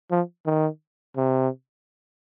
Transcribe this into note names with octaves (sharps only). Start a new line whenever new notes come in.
F3
D#3
C3